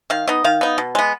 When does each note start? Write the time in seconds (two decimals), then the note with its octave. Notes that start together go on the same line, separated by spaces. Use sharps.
0.10 D#3 F5
0.27 B3 D#4 D#5
0.44 D#3 F5
0.61 B3 D#4
0.78 B2
0.95 G#3 B3